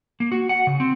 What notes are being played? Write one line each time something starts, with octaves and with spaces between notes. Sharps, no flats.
A#3
F#4
F#5
C#3
C4